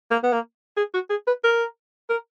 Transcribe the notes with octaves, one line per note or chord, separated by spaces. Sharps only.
A#3
B3
A#3
G#4
F#4
G#4
B4
A#4
A#4